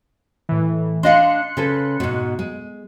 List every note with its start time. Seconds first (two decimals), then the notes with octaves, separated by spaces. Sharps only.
0.49 A2 E3
1.03 D4 D#5 F5 C6 F#6 C#7
1.57 C#3 A4 B4
2.00 G#2 B2
2.39 G#3